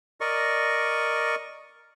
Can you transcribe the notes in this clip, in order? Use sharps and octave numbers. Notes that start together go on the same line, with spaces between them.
A#4 D5 D#5 C#6